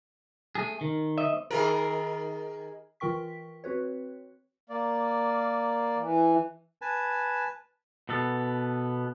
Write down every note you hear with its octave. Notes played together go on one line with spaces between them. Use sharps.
A3 G#4
D#3
D#5 E5
D#3 G#4 A#4
E3 F4 A#4 G5 C#6 B6
C4 F#4 B4 C#5
A#3 D5
E3
B4 G#5 A5
B2 B3 A4